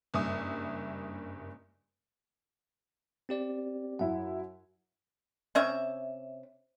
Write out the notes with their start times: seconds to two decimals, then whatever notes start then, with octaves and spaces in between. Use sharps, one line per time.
0.14 F#1 G2 E5 D#6
3.29 C4 G4 D5
3.99 F#2 E4 F#5
5.55 C3 C#4 E5